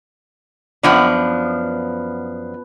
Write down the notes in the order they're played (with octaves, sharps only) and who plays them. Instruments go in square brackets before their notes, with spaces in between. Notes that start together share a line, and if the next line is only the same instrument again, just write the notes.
[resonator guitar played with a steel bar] F#2 F3 D4 [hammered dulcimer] B3